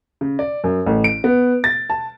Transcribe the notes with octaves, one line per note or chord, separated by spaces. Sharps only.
C#3
D5
F#2
A1
D7
B3
A6
A5